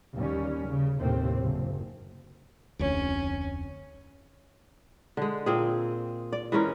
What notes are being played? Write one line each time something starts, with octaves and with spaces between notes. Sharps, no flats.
D#2 G3 C#4
C#3
D#2 A2 C3 C4
F#1
F1 D2 C#4
D3 G#3
A#2 C4 G#4
D5
E3 G#3 C#4 A#4